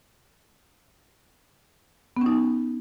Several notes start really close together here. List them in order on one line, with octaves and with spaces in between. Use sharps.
B3 C#4 D#4